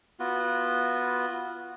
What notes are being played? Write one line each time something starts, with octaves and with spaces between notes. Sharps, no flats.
B3 F4 F#4